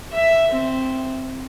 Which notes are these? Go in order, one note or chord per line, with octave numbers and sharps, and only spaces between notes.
E5
C4